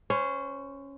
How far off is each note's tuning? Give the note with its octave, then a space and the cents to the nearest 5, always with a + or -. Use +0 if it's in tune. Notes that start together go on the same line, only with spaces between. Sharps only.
C#4 +0 C5 -25